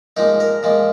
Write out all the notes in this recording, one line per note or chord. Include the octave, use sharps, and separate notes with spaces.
A#2 F3 G#3 D#4
A#4
A#2 F3 G#3